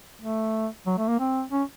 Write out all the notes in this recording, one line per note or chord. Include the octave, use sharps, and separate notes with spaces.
A3
F#3
A3
A#3
C4
C#4